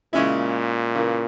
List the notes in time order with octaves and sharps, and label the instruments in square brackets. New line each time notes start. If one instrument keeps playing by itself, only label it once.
[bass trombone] A#2 [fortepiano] C#3 G#3 C#4 E4
[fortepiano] C#3 E3 A#3